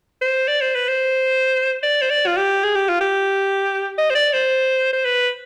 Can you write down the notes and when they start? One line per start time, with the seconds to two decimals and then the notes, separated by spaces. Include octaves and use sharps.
0.22 C5
0.48 D5
0.61 C5
0.75 B4
0.89 C5
1.83 D5
2.02 C5
2.10 D5
2.27 F4
2.37 G4
2.64 G#4
2.76 G4
2.89 F4
3.01 G4
3.98 D#5
4.10 C5
4.15 D5
4.34 C5
4.93 C5
5.05 B4